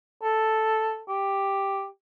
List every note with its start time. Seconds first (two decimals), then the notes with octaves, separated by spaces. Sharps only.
0.23 A4
1.09 G4